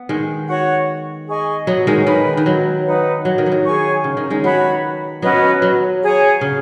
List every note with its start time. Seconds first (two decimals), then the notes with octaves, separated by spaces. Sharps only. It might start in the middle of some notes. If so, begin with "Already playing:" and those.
Already playing: B3
0.09 D#3 G#3
0.49 F#4 C#5 F#5 C#6
1.28 G#4 D#5 G#5 C#6
1.67 F#3 B3
1.87 D#3 G#3
2.06 D#3 B4 G#5 B5
2.37 D#3
2.46 F#3
2.86 D#4 B4 F#5
3.25 F#3
3.38 D#3
3.46 F#3
3.52 D#3
3.65 G#4 C#5 G#5 C#6
4.04 C#3
4.17 D#3
4.30 D#3 G#3
4.43 F#3 B3 F#4 C#5 B5
5.22 F#3 B3 C#4 F#4 B4 D#5
5.62 F#3
6.02 G#4 C#5 G#5
6.41 C#3